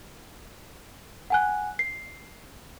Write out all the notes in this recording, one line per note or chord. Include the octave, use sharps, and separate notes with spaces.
F#5 G#5 F#6
C7